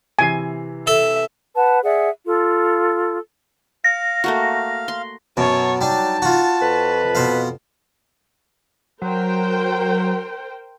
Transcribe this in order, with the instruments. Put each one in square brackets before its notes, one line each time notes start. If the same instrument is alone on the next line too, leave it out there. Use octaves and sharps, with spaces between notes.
[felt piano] C3 E3 C7 [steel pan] G#5
[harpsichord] A4 [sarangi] E5
[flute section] B4 F#5 A5
G#4 D5 E5 F#5
F4 A4
[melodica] F5 [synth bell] A#6
[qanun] A3 A#3 F#4
C6
[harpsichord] F#2 B2 [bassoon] F#3 [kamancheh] C#5 A5
[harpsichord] G3 D4 [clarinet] D#4 [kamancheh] A5
[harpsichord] F4 F#4
[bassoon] F2 [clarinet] B4
[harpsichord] B2 C5 F5
[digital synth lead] F#3 [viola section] A#4 C5 G5